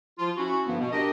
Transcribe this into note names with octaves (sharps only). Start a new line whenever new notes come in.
F3 F4
C#4 E4 F#4
G2 D3 F3 B3
B2
D4 G4 A#4 D#5